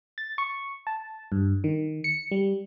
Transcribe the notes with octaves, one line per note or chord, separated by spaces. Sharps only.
A6
C#6
A5
G2
D#3
C#7
G3